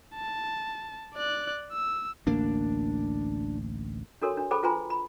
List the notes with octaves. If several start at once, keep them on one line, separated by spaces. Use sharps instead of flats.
A5
D5 F#6
E6
A1 D2 A#3 D4
D4 F#4 A4 A#4 C#5 C6
D4
G#4 A4 C5 G5 B5 D6
F4 B4 G5 G#5 A#5 C6
B5